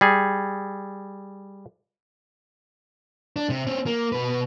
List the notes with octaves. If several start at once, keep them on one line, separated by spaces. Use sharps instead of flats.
G3 G#4
D4
C3
C4 C#4
A#3
B2 B4